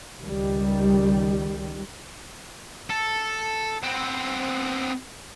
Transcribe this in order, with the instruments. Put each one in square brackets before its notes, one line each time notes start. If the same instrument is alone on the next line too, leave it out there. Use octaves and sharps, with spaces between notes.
[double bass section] C#2 D#3 G3
[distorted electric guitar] A4
B3 C4